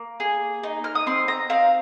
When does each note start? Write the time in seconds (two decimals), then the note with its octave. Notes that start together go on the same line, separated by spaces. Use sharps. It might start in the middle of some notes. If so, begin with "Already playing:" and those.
Already playing: A#3
0.20 G#4
0.63 D#4
0.84 F6
0.95 D#6
1.07 C4 C6
1.28 A#5
1.50 C4 F5